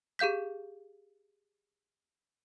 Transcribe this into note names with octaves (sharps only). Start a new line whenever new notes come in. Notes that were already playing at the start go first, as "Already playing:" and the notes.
G4 G#4 F5 G6 B6